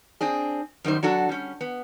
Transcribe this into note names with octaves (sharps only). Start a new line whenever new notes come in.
C4 D4 G#4
F#2 D#3 G3 C5
F#3 D4 F#4 A4
G3 C#4
B3